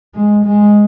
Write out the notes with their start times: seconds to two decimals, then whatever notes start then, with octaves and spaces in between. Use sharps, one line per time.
0.14 G#3
0.45 G#3